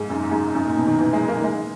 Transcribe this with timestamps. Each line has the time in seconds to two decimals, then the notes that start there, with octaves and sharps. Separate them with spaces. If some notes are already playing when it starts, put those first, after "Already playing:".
Already playing: G#2
0.10 F#2 D#4
0.31 G#2
0.55 F#2
0.65 A#2
0.77 B2
0.87 D#3
0.99 E3
1.13 G#3
1.28 A#3
1.44 G#3